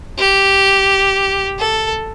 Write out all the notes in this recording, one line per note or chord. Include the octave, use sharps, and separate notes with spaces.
G4
A4